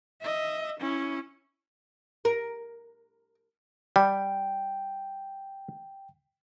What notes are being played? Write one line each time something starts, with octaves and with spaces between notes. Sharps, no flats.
D#5 E5
C#4 E4
A#4
G3 G5